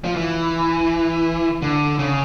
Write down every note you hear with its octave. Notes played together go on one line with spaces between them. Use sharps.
F3
E3
D3
C#3